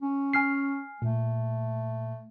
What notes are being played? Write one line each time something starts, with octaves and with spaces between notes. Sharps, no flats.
C#4
G#5 F6 C7
A#2 A3